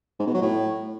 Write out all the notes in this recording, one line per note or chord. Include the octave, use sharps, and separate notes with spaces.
G#2
B2
F#3
A2